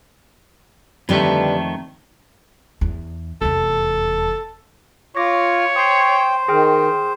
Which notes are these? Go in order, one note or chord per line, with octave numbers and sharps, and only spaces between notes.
F2 D3 D#3 G3 A3 B4
E2
F1 E2 A4
F4 C#5 D6 A#6
C5 G5 D#6 C7
D#3 G#4 G5 F6